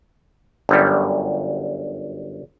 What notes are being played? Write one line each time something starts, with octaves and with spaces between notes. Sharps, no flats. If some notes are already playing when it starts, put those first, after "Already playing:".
G1 F#2 G3